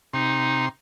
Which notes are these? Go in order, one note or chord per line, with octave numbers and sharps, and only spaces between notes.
C3 D#4 C6